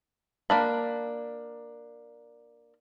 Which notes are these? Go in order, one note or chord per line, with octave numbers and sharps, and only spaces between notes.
A#3 D4 B5